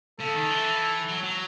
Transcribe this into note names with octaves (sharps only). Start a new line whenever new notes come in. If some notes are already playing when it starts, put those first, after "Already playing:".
C#3 A4
D#3
E3
F#3
F#3